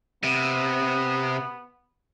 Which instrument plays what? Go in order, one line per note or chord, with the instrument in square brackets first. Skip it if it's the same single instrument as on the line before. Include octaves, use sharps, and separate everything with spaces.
[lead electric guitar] C3 [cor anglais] B3